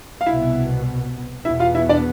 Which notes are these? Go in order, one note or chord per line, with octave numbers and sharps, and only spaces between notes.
F5
C2 B2 B3 E4 E5
E2 B2 B3 E4 E5
F4 F5
E4 E5
D4 D5